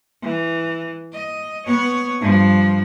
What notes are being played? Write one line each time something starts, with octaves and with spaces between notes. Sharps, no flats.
E3
D#5
B3 C#5
G2 F3